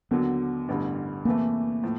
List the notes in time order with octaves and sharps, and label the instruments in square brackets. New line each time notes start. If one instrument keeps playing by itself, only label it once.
[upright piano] D#2 D3 F#3 [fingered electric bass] B3
[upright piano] A1 G2 D3 G3
[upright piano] E2 C3 E3 A3 [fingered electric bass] A#3
[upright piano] A2 F3